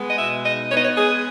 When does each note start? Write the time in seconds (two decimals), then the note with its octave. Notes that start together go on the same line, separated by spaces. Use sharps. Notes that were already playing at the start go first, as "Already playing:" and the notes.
Already playing: G#3 B3
0.09 D#5
0.18 B2 E5
0.45 D#4 D#5
0.70 B3 C#5
0.77 D#5
0.84 C#5
0.96 G#3 G#4